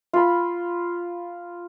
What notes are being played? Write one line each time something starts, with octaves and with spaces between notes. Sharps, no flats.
F4 B5